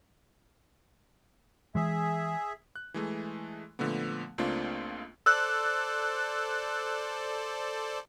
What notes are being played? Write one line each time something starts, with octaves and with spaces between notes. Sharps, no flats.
E3 G#3 G#4 E5
F#6
E3 G#3 A3
A#2 D3 F3 A3 B3
C#2 A3 A#3 C4 D4 F4
A4 C5 D5 E6 F#6